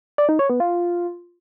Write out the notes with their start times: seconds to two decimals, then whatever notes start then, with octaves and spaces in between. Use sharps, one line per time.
0.18 D5
0.29 D#4
0.39 C#5
0.50 B3
0.60 F4